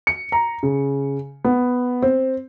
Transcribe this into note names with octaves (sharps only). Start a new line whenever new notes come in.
C#7
A#5
C#3
B3
C4